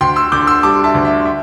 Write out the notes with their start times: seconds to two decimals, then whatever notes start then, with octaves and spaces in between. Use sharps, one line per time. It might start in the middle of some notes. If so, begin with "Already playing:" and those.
0.01 D2 G5 C6
0.16 C6 E6
0.32 D3 D6 G6
0.47 C6 E6
0.63 G3 A5 D6
0.84 E5 A5
0.94 D2
1.05 E5
1.25 E5